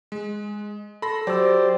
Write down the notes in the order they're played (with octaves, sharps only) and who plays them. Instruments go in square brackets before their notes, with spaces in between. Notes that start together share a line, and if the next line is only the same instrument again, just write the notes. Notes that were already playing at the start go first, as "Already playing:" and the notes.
[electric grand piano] G#3
[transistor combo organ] A4 [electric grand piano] B5 C6 A#6
[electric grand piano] F#3 E6 [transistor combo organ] G4 C5 D5